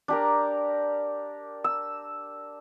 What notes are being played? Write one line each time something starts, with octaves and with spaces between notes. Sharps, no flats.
D4 G4 A#4
E6